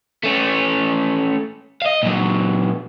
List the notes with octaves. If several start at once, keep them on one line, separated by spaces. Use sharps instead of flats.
A3 C#4
D#5 F5
A#2 F#3